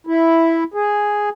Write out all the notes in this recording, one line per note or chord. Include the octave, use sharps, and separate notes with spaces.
E4
G#4